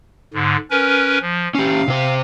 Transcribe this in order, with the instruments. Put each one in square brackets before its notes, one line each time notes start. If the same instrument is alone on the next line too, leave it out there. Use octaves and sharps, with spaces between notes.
[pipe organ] G#2 D3
C#4 A#4 B4
F3
[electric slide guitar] C#4 G4 [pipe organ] F5
[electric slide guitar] C3 C5